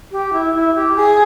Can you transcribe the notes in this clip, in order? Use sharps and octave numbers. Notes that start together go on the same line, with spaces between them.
G4
E4
E4
G4
G#4